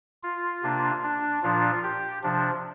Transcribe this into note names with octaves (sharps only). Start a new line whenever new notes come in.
F4
C3 A#3 D4
D4
A#2 F3 D4 F4
G4
C3 F3 D4